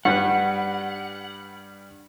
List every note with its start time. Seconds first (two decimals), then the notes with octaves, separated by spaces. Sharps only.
0.05 G2 G3 B4 F#5